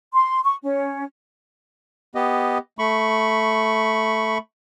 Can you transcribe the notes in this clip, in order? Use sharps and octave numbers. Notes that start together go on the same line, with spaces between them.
C6
C#6
C#4
B3 G4 D#5
A3 B5 C#6